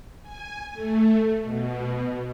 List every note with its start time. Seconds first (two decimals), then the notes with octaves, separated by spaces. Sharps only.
0.22 G#5
0.72 A3
1.42 B2